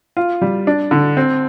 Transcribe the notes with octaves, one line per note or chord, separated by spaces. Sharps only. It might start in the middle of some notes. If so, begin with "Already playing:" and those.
F4
G3
D4
D3
C4